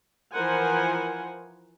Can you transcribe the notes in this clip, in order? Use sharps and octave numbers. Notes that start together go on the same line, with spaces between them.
E3 F3 A#4 C5 F#5 G#5